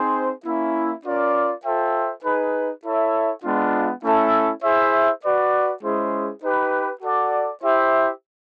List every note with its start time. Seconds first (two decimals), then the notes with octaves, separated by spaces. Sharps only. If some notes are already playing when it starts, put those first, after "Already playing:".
Already playing: C4 D#4 G#4 C5
0.44 A#3 C#4 E4
1.04 C#4 F4 A#4 D5
1.63 F4 A4 C5 E5 G5
2.23 D#4 G#4 B4
2.83 E4 A4 C#5 E5
3.43 G#3 B3 D4 F4
4.02 A3 C#4 E4 A4
4.63 E4 G#4 C5 E5
5.23 F#4 B4 D5
5.82 G#3 C#4 E4 G#4 C5
6.42 D#4 G4 B4
7.02 F#4 A4 D5 F#5
7.62 E4 G4 C5 E5